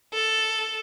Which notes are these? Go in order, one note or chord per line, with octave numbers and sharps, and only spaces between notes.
A4